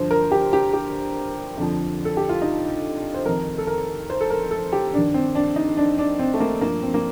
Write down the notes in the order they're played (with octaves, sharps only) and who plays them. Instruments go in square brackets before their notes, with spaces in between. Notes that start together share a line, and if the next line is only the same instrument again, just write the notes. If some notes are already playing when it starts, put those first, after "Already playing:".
Already playing: [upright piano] G2 D3 F3 C5
A#4
G4
G4
G4
F2 D3 F3
A4
G4
F4
D#4
C5
F2 D#3 A#4
A4
A#4
C5
A4
A#4
A4
G4
G2 D#3 D4
C4
D4
D#4
D4
D4
C4
A3
A#3
G2 F3 A#3
C4
A#3